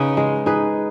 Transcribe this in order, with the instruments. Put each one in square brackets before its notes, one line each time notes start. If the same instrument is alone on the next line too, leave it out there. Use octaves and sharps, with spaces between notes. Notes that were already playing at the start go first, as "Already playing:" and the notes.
Already playing: [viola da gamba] C#3 [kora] D#4 G#4 B4
[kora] G#3
D#4 G#4 B4